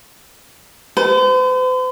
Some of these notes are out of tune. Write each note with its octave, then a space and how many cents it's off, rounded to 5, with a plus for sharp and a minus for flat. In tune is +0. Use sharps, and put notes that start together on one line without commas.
C5 -45